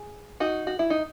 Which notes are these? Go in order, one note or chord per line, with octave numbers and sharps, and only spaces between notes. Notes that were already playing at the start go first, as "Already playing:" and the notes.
Already playing: G#4
D#4 F#4
F#4
E4
D#4